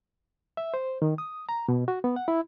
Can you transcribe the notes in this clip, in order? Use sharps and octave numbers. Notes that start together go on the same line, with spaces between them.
E5
C5
D#3
D#6
A#5
B2
F#4
B3
F#5
E4